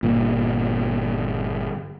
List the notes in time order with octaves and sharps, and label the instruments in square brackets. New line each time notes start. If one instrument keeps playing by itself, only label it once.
[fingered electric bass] G1 A#2